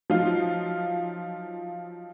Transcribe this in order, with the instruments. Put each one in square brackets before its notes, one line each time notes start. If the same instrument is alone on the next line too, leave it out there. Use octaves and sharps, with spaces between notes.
[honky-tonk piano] F3 F#3 D#4 F4